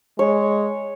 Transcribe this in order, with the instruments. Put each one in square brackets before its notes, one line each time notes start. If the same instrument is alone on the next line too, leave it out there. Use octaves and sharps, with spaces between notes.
[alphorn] G#3 [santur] C#5